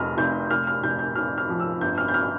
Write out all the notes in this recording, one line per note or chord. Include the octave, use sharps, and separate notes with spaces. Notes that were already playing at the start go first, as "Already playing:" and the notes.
Already playing: F1 F2 F6
F1 G6
F1 F6
F6
F1 G6
G6
F1 F6
F6
F3
E6
G1 G6
F6
G6
F6